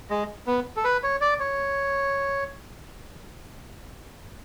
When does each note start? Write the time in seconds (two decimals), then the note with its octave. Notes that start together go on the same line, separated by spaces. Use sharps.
0.10 G#3
0.47 B3
0.77 A4
0.84 B4
1.03 C#5
1.21 D5
1.40 C#5